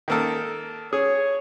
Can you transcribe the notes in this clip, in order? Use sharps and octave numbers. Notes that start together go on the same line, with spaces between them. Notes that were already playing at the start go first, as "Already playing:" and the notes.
D#3 A#3 A4
G#4 C#5